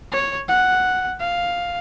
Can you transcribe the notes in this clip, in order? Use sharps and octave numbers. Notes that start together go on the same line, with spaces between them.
C#5
F#5
F5